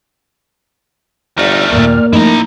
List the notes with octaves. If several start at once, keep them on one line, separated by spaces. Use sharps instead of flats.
G1 A3 D#4 D5 F6
D#2 A#2 A#3
F3 A3 D#4 E4 A#5